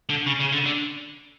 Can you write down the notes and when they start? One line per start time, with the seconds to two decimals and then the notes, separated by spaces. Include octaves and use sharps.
0.09 D3
0.26 C#3
0.40 C#3
0.52 D3
0.66 D3